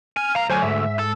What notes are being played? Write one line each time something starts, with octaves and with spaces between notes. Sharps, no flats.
G#5 F6
C2 F5 A#5
D2 F#3 C5 G#5
G#2 E5
A4